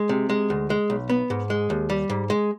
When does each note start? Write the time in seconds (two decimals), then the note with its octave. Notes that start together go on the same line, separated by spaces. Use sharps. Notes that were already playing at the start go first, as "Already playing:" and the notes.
Already playing: G#3
0.09 C3
0.30 G#3
0.50 D2
0.70 G#3
0.90 B1
1.09 B3
1.30 G#2
1.50 G#3
1.70 D#2
1.90 G3
2.10 G#2
2.30 G#3